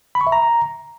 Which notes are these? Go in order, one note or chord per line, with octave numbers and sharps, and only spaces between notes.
B5
C#6
E5
A#5